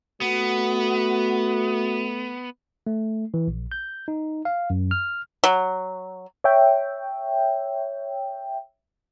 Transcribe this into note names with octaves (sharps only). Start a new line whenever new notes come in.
A3 B3 F#4
A3
E3
A#1
G6
D#4
F5
F#2
F6
F#3
C#5 E5 G5